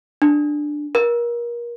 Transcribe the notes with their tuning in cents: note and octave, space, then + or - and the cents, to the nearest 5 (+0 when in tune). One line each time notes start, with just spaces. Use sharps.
D4 +10
A#4 +30